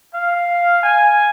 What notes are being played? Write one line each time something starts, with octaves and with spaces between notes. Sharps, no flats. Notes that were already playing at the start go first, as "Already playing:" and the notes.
F5
G#5